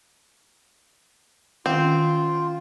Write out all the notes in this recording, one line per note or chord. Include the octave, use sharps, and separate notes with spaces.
D#3 C4 C#4 F4 F#5